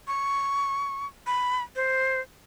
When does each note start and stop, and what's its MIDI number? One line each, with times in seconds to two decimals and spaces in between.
0.07 1.06 85
1.27 1.62 83
1.76 2.20 72